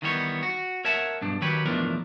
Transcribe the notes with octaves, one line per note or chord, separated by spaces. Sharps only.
D#3 E3 G3 B3 A4 C#5
F#4
A#4 C#5 E5 F#5 A5
B1 G2 D4
D#3 F#3 G4 B4 C#5
B1 E2 A2 F3 D4 A#4